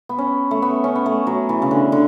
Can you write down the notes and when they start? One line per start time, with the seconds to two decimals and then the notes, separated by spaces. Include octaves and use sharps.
0.09 B3
0.18 C#4
0.51 A3
0.62 B3
0.84 C#4
0.95 B3
1.06 A3
1.27 F#3
1.49 E3
1.62 C#3
1.71 D3
1.92 D3